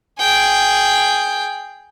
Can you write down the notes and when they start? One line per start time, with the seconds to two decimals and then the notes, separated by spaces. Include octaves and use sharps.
0.19 G#4 G5